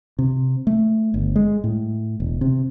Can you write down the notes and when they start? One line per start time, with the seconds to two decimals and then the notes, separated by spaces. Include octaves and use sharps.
0.19 C3
0.67 A3
1.14 G1
1.36 G#3
1.64 A2
2.20 E1
2.41 C3